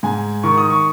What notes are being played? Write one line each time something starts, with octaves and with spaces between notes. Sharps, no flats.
G#2 G#5
D#3 C#6
D#6
C#6